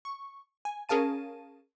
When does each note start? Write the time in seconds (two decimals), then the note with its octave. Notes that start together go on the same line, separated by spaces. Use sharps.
0.05 C#6
0.65 G#5
0.89 C#4 G#4 A#4 F5 A5 D#7